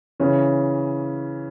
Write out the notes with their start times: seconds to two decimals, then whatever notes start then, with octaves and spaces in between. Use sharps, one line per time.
0.20 C#3 E3 C#4